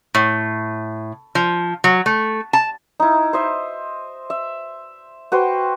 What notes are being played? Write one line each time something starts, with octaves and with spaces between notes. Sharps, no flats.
A2
F3
F#3
A3
A5
D#4 E4
C5 D#5 E5
E5
F#4 B4 C5 G5